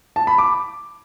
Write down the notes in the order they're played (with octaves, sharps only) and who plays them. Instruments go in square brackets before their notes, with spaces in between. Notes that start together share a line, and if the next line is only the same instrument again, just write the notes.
[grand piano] A5
B5
D6